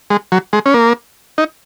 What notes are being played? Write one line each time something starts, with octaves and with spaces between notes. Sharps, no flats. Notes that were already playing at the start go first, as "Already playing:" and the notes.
G#3
F#3
G#3
C#4
A#3
D#4